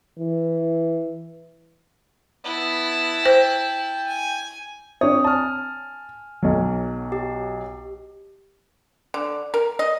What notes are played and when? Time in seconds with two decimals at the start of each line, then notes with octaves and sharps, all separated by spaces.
0.19 E3
2.45 B3 E4 A5
3.26 C5 G5
4.07 G#5
5.01 C4 D4 C#5 D#6 G6
5.24 G#5 A5 F6
6.42 B1 F#3
7.12 G4
9.14 D3
9.54 A#4
9.79 D#5